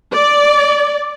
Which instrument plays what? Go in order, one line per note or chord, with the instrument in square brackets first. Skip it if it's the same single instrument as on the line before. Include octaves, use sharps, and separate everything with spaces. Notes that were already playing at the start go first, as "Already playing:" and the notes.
[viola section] D5